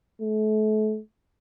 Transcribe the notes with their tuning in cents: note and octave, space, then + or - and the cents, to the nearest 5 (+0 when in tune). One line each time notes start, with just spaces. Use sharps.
A3 -35